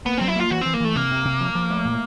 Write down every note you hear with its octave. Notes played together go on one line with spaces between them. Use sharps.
A#3 B3
F#3 C4
E4
A#3 F4
E3 F#4
E3 C4
A#3
E3 A3
C3 A#3
C3
C3
F3
F3
A3
A#2